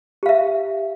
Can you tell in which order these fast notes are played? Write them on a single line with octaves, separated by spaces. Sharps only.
G4 F5 E5